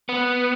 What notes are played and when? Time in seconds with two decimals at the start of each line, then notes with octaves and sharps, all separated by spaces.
0.09 B3